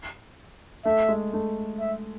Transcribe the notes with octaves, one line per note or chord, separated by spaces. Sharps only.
A3 E5
G#3
A3
E5